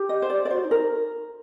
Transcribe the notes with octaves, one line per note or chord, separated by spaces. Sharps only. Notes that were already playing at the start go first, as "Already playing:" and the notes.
Already playing: G4
D#5
C5
D5
D5
F#4 C5
D#4
A#4